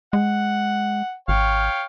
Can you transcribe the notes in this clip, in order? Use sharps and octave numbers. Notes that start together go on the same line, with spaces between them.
G#3 F#5
G#1 C#5 F5 G5